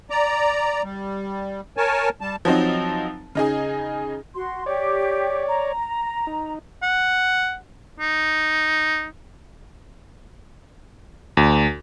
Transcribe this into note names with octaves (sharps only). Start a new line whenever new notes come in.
D5 A#5
G3
A#4 C#5 G#5 A5
G3 A5
F3 F#3 C4 D#4
C#3 D#4 G#4
F#4 C6
G4 C#5 D5
A#5
D#4
F#5
D#4
D2